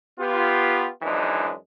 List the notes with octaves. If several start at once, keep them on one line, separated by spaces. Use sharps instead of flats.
B3 F4 G4
F#2 E3 F3 G#3 D4 D#4